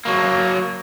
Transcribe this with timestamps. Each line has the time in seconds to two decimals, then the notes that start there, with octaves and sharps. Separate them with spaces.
0.05 F#3 A#3